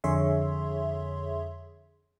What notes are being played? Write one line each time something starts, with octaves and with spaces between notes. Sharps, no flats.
F2 D3 G#4 C#5 E5 C6